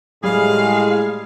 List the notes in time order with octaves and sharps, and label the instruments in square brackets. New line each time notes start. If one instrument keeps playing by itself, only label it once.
[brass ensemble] A2 G#3 [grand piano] G3 [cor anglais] G#4 [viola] F5